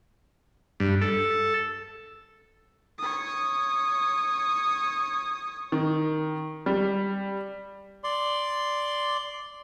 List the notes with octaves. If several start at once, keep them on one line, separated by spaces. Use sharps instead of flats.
G2
A4
C#5 D#6
D#3
G3
D5 C6